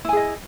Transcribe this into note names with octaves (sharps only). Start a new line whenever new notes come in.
E4 G#4 D#5 G#5